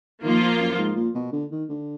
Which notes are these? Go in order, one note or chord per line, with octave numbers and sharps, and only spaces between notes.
D#3 F3 A#3 F4
A#2
F#2
G#2
A#2
B2
D3
D#3
D3